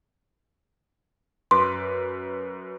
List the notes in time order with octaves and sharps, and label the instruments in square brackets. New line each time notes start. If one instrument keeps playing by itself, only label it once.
[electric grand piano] F#2 B4 D6 [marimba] C6